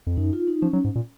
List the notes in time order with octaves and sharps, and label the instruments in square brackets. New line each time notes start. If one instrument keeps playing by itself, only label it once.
[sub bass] F2
[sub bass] F#2 [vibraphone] D#4
[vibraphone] F4
D#4
[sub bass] F3 [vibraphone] C#4
[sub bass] F#3
G#2
A#2